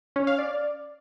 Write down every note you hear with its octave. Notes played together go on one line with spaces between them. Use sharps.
C#4
F5
D5